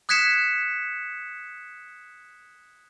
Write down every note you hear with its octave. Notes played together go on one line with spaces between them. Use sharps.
D#6 F#6 G#6 B6 C#7 E7